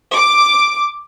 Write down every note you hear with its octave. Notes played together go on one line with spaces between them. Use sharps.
D6